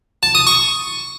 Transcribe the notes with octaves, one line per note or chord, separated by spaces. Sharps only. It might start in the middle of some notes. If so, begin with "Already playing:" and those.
A5
D#6
C#6